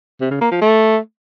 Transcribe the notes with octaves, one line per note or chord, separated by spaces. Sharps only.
C3
C#3
A#3
F3
A3